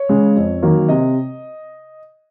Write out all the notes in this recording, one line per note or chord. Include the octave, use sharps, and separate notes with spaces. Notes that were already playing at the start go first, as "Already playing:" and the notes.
Already playing: C#5
C#3 G#3
F2
D#3 F#3 A#3
C3 D#5